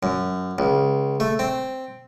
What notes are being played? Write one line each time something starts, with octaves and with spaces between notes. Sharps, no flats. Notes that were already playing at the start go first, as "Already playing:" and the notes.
F#2
C#2
A3
C4